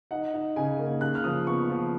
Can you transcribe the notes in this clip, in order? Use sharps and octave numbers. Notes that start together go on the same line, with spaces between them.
D#4 F#5
D#4
C#3 G#5
A#3
C#3 F#6
F6
F3 D#6
B3 C#6
F3